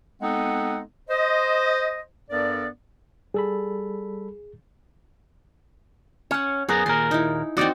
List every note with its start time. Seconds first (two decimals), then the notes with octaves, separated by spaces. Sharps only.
0.22 G#3 B3 C4 D#4 A4 F#5
1.10 C5 D#5
2.31 G2 B3 A4 A#4 D5
3.34 G3 G#4 A4 B5
6.31 C#4 C#5 F#5
6.69 F#2 B3 G#4 A#4
6.86 D#2 A#2 A#4 C6
7.11 D#4 E4
7.57 E2 C4 D#4 F#4 D5